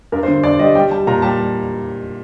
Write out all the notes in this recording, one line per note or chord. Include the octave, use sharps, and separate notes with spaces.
G2 A#4
C5
D3
G2 D5
G3 D#5
G3 G5
G3 A5
A#2 A#5
G3 A5